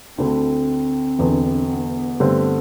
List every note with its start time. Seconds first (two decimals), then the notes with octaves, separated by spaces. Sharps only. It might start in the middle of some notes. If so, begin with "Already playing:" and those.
0.18 D2 D3 A3 C4
1.19 E1 E2 D3
1.69 B3
2.20 G2 D3 A3 C4